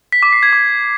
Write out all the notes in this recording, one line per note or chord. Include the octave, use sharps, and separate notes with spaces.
B6
D6
C7
G#6
D6